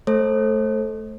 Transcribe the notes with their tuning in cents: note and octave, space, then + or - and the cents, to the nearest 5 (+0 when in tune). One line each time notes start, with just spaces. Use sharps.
A3 -10 A4 +0 C5 +30